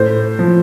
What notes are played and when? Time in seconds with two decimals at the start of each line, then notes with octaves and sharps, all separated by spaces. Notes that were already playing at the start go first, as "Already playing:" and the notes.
Already playing: A2 C5
0.39 F3